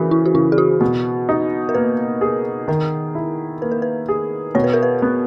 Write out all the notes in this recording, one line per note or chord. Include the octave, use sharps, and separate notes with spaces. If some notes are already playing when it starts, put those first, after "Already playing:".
Already playing: C#3 E3 F#4 G#4 A#4
E4
F#4
C#3 E4
G#4
F#4
B2
D#4
A#4
A#3 B4
G#4
D#3 A#4
E4
A#3 B4
A#4
B4
G#4
B2 C#5
B4
A#4
B4
B3